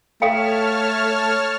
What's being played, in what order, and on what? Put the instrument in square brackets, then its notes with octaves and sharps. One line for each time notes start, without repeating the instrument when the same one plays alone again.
[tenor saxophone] A3 [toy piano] A4 F5 G5 [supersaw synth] C#5 A5 F6